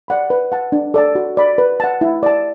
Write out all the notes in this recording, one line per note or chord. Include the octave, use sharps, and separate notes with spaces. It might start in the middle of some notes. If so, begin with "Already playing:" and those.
D5 F#5 B5
B4
F#5 A5
D4
A4 D5 A5
F#4
D5 B5
B4
F#5 A5
E4
D5 A5